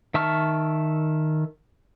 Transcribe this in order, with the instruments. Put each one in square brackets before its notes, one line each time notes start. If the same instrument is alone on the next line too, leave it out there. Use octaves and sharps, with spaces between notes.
[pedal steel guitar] D#3 E5 A5 C#6 F6